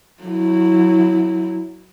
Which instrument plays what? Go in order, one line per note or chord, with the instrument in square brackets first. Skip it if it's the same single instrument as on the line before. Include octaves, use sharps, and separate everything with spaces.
[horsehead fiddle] F#3 E4